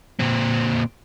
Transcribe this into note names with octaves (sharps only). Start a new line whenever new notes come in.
A#2 C4